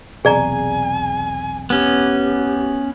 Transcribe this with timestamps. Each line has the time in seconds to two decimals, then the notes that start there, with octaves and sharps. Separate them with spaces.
0.25 B1 E2 C3 G#4 D5 G#5 A#5
1.70 B3 C#4 G4